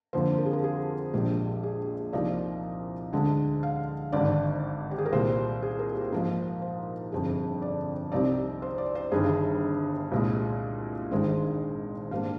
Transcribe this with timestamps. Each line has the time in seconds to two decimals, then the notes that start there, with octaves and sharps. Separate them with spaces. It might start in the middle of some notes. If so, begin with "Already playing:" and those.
0.13 F2 D3 F3 A#3 C5
0.38 A#4
0.46 G#4
0.53 A#4
0.64 G#4
1.14 A#1 A#2 G#3 D4 G4
1.63 G#4
2.13 C2 C3 F3 A#3 D#4 D5
3.13 D2 D3 G#3 D4
3.63 F5
4.12 G#1 G2 D3 D5
4.91 G4
4.98 G#4
5.05 A#4
5.12 C2 A#2 G3 C5
5.63 G#4
5.79 A#4
5.95 G4
6.12 G#2 F3 A#3 D#4 A#4
6.62 C5
7.12 G1 F2 C3 G3 G#4
7.62 D5
8.12 C2 C3 G3 C4 D#4 D5
8.62 C5
8.78 D5
8.95 C5
9.12 G1 G2 D#3 G#4
10.12 C2 A#2 G#3
11.11 G#1 G2 D#3 G#3 C5
12.11 G#2 G3 A#3 D4 F5